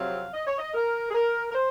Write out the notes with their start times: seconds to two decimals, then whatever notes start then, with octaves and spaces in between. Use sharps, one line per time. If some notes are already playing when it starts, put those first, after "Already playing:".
Already playing: F2 C3 F#3 C4 F5
0.34 D#5
0.46 C#5
0.58 D#5
0.74 A#4
1.10 G#4
1.14 A#4
1.50 A#4
1.54 C5